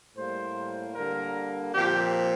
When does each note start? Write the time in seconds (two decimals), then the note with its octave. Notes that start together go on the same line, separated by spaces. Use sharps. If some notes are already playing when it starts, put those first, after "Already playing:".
0.16 A2 G3 A#3 C5
0.95 D3 G3 A#3 A#4
1.74 A#2 F3 C4 G4